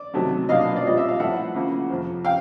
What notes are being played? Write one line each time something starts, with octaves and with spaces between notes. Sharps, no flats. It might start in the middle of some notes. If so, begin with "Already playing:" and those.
Already playing: D5
C3 D#3 F#3 A3
B2 F#3 A#3 D4 D#5 F5
D5
A#2 G3 C4 F4 D#5
E5
F5
A2 F3 A3 E5 F#5
C#3 F3 A#3
F2 C3 F3
F5 G5